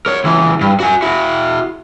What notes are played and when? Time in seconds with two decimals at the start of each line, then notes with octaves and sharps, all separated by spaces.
0.06 A#4 C#5
0.24 C#2 E3
0.61 G2
0.80 F#4 G#5
1.02 E4 F#4